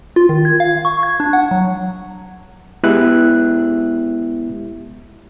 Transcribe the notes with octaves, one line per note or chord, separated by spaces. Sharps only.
F4
D#3
G#6
F5
C#6
G#6
D4
F#5
F#3
G#3 B3 E4 G4 E5 F#6